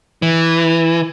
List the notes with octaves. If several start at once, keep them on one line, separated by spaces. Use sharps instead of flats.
E3